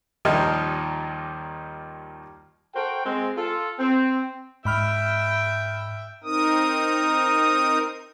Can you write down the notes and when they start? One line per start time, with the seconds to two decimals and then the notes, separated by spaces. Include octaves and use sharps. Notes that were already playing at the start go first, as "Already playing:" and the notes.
0.25 D#2 A#2 D#3 F3 G3 D#4
2.75 F#4 A4 A#4 C5 G5
3.05 G#3 C4
3.37 F4 A4
3.79 C4
4.65 G#2 E5 G5 B5 F6
6.24 C4 D#4 A#4 D#6